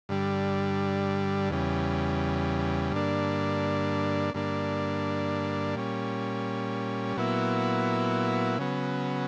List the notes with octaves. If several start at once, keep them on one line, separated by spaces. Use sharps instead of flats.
G2 D3 G3
E2 C#3 G3
G2 D3 A#3 D4
G2 D3 A#3 D4
A#2 G3 C#4
A#2 F#3 B3 E4
C#3 F#3 B3